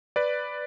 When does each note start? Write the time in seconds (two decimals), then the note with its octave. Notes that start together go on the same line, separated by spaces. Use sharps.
0.16 B4 D5